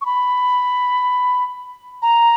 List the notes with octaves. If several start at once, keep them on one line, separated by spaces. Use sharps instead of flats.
C#6
B5
A#5